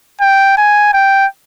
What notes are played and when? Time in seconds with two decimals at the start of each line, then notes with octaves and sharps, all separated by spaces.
0.21 G5
0.58 G#5
0.94 G5